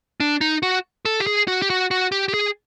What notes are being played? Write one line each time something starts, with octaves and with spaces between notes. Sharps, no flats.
D4
D#4
F#4
A4
G4
G#4
F#4
G4
F#4
F#4
G4
G4
G#4